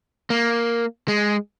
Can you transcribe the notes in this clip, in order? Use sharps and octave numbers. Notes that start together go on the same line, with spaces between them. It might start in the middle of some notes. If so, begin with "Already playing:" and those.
A#3
G#3